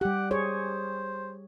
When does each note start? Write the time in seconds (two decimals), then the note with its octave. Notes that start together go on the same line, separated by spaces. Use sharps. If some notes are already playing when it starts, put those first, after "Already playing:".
0.01 G3 G4 F#5
0.31 G#4 C5 C#5